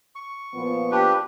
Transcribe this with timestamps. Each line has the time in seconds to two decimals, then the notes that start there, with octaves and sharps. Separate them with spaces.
0.15 C#6
0.54 A#2 F3 B3
0.92 D4 G4 B4